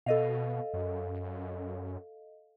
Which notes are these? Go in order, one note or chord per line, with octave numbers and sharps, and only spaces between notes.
B2 A4 D#5 F5
F#2